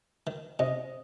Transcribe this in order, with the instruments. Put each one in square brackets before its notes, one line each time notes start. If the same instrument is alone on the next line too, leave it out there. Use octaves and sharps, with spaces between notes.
[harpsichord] D#3
[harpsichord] C3 [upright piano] D#5